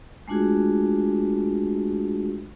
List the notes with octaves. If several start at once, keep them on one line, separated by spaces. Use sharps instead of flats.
G#3 A3 D4 F4 F#4 G#4